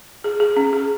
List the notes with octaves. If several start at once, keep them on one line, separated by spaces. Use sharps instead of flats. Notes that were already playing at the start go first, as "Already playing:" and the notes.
G#4
G#4
C#4
G#4